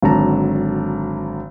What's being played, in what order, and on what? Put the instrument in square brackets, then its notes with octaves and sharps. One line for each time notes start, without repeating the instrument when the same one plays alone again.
[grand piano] G#1 D3 F#3 A5 A#5